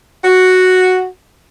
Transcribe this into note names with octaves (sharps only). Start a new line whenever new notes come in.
F#4